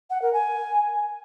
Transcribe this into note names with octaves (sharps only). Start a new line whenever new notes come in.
F#5
A#4
G#5